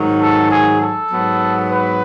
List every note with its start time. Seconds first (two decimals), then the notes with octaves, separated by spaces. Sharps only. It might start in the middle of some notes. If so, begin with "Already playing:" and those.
Already playing: G#2 D#3 F#3
0.21 A4
0.51 G#4
0.82 A4
1.11 G#2 F#3 B3
1.71 B4